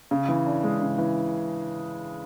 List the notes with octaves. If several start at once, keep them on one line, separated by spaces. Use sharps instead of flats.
C#3
E3
D4
G#3
C#3
E3